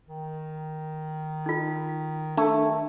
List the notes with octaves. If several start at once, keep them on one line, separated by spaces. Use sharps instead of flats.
D#3
D#4 F4
D#3 A3 D4